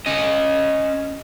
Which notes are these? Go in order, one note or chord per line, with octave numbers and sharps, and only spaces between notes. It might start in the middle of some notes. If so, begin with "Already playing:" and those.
C#4 D#5